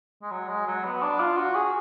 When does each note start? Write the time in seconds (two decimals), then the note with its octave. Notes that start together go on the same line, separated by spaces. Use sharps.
0.22 G#3
0.31 F#3
0.48 G#3
0.67 F#3
0.85 B3
1.02 D4
1.20 F4
1.37 F#4
1.55 G#4